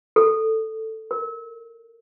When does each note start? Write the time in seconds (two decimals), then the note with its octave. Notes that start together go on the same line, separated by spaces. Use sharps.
0.16 A4
1.11 A#4